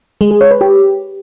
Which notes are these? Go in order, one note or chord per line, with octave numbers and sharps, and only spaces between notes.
G#3
G#4
C#5
B4
G4